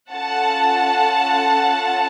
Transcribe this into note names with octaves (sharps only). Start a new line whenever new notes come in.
C#4 F4 A4 F#5 A5